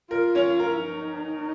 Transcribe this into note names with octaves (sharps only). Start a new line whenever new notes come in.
F4 A#4
C#4 C#5
A#4 A#5
D#4